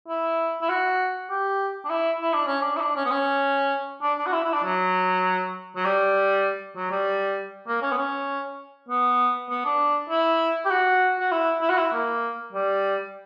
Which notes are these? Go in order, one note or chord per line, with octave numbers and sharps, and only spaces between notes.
E4
E4
F#4
G4
D4
E4
E4
D4
C#4
D4
E4
D4
C#4
B3
C#4
D4
D4
F#4
E4
E4
D4
F#3
F#3
G3
F#3
G3
A#3
C#4
B3
C#4
B3
B3
D4
E4
G4
F#4
F#4
E4
E4
F#4
E4
A#3
G3